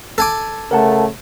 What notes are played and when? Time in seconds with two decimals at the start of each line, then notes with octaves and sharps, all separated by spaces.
0.18 A4 G#5 D6
0.71 C#3 A3 A#4 F#5 A5